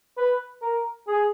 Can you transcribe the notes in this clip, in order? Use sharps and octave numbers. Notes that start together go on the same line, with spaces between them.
B4
A#4
G#4